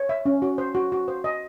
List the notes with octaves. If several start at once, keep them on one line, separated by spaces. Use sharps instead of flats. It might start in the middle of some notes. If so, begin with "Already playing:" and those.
Already playing: C#5
E5
C#4
F#4
C5
F#4
F#4
C5
D#5